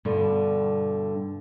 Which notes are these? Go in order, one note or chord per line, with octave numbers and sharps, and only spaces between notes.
G2 B2 D3